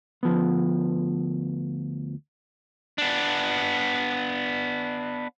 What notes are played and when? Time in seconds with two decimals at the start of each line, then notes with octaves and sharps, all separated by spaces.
0.23 D2 F3 B3
2.98 B3 D4